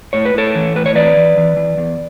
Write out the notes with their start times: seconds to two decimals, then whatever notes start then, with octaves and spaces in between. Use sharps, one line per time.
0.13 A2 C#5
0.25 B4
0.34 A2 A4 C#5
0.55 E3
0.75 A2 B4
0.86 C#5
0.95 E3 B4 D5
1.17 E3
1.37 E3
1.57 E3
1.78 E2